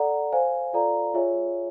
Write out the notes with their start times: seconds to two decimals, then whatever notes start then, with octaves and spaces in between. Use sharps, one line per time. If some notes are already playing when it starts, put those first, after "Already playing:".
Already playing: A4 D5 F#5 A#5
0.32 C5 F5 G#5
0.73 F4 A4 D5 F5 A#5
1.14 F4 G#4 C#5 E5 G#5